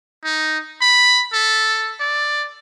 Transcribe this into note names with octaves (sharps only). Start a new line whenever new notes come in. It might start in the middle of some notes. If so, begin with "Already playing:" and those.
D#4
B5
A4
D5